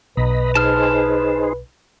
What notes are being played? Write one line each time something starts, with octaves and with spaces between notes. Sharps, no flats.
B1 B4 D#5 A#5 B5
D#4 G#4 C5 A5 F6